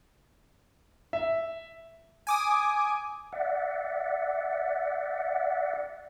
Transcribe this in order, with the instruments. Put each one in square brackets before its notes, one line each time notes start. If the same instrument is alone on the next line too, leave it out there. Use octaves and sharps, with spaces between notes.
[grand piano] E5
[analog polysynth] G#5 D6 D#6
[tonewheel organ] D5 E5 F#5